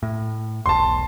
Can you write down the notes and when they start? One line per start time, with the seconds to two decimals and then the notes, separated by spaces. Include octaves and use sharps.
0.03 A2
0.66 E1 B1 A5 C6